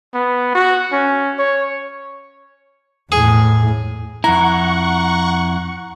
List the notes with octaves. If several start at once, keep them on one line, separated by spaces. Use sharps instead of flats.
B3
F#4
C#4
C#5
E2 A2 G#4
F2 E4 F#5 A#5 C#6